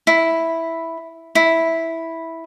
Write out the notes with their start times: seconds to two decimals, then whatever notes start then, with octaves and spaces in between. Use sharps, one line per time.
0.07 E4
1.35 E4